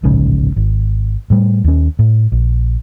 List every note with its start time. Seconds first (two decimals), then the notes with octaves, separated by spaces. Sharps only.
0.03 D1 A#1 G#2 C#3
0.56 G#1
1.30 A2 G3 A3
1.64 D#2 C#4
1.99 A2
2.32 A#1